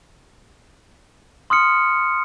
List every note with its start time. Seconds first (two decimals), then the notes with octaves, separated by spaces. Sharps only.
1.50 C6 D#6 F6 C#7